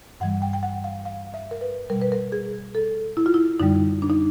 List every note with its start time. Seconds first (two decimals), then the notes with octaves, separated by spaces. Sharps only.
0.20 G2 E3 G3 F#5
0.42 G5
0.53 G5
0.63 F#5
0.84 F5
1.06 F5
1.34 E5
1.51 A#4
1.61 B4
1.90 B2 G3 A#4
2.01 B4
2.12 A#4
2.32 G#4
2.75 A4
3.17 E4
3.26 F4
3.34 E4
3.60 F#2 D3 G3 D#4
4.02 D4
4.10 D#4